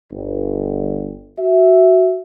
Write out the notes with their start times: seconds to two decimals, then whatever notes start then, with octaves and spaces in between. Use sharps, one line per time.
0.12 G1
1.38 F#4 E5